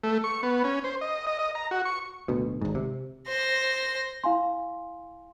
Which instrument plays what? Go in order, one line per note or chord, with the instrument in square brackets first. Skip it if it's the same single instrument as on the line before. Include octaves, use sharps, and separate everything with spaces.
[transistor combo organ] A3
C#6
B3
C#4
C5
D#5
D#5
D#5
A#5
F#4
C#6
[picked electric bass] D1 D2 B2
G#1 G#2
C3
[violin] C5 A#6
[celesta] E4 F5 G#5 C6